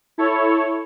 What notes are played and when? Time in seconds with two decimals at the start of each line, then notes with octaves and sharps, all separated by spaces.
0.18 E4 A4 C#5